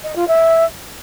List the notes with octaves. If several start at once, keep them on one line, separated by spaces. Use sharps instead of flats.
D#5
F4
E5